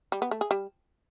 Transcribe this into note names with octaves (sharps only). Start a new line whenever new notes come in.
G3
B3
A3
G#4
G3